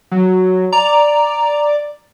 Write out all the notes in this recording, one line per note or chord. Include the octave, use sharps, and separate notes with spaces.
F#3
D5 A#5